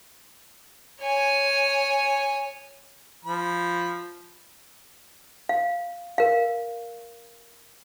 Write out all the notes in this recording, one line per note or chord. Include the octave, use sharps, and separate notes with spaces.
C#5 G#5
F3 B5
F5
A#4 F5